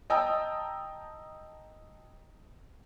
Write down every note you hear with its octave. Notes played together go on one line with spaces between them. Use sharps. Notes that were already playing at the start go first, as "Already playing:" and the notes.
D#5 G5 A5 A#5 D#6 E6